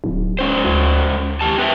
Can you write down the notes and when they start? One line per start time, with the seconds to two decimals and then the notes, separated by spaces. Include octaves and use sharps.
0.04 D1
0.39 G#3 C#4 C5
0.65 D2
1.41 D#3 G4 A5
1.58 C4 B4 E5